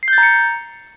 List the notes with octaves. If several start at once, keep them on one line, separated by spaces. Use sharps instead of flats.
C7
G6
A6
A#5
C#7